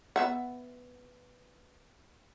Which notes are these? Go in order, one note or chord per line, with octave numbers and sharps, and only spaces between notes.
B3 E5 F#5